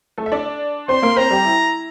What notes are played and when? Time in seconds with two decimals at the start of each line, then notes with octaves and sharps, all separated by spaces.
0.18 A3 A4
0.26 E5
0.32 D4 D5
0.88 C4 C5 C6
1.02 A#3 A#4
1.17 C4 C5 A#5
1.31 G3 G4
1.45 E4